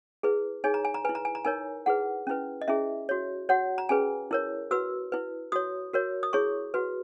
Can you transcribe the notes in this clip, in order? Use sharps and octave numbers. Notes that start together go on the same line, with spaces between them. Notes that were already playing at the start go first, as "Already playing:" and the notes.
E4 G#4 B4
D#4 G#4 C#5 G#5
A#5
G#5
A#5
E4 B4 G#5
A#5
G#5
A#5
D#4 A#4 C#5 G#5
E4 G#4 B4 F#5
C#4 E4 B4
D#5
C#4 E4 G#4 E5
F#4 C#5
F#4 C#5 F#5
A#5
C#4 G#4 B4 G#5
E4 A#4 C#5
F#4 B4 E6
E4 B4
F#4 C#5 D#6
F#4 A#4 C#5
D#6
E4 G#4 C#5 C#6
F#4 B4